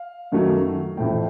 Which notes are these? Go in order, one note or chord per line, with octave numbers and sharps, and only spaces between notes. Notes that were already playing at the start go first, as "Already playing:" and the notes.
Already playing: F5
F#2 D#3 F#3 A3
A1 A2 F3 A3 G5